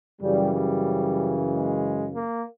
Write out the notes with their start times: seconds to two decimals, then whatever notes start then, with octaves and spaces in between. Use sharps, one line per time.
0.21 F#2 C#3 E3 G3
0.53 G3
1.49 G#3
2.13 A#3